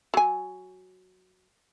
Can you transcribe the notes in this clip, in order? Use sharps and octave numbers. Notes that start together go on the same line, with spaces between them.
F#3 G#5